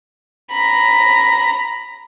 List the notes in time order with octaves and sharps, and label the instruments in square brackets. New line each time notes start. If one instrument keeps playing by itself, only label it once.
[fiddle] A#5 B5